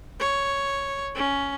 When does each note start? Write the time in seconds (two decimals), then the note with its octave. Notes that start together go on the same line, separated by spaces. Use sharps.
0.19 C#5
1.15 C#4